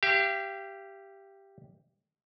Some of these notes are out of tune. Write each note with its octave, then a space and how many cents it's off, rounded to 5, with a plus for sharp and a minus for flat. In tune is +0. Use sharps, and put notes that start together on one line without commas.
G4 +0 F5 -45